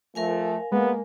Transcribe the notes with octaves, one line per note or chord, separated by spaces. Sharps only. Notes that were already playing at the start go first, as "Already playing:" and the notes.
F3 A3 A#4 F5 G#5
G#3 A#3 B3